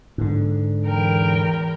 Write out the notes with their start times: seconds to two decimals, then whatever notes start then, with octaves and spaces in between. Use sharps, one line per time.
0.18 G#2 D3
0.84 E2 A#4 G5